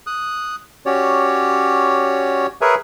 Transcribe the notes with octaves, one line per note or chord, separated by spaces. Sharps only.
D#6 F#6
C#4 F#4 G4 C#5 D5
G#4 A#4 B4 C#5 E5 G#5